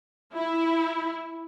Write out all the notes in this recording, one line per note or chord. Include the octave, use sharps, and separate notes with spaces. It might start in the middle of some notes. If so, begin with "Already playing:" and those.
E4